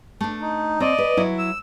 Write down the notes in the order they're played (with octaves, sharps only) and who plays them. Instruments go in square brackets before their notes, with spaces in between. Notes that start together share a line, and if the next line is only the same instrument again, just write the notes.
[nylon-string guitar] A3 D4
[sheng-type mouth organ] D#4
[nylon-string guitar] C4 [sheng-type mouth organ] D5 D#5
[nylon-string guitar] B4
F#3 E4
[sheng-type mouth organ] E6